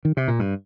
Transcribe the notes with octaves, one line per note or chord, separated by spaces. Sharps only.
D#3
C3
A#2
G2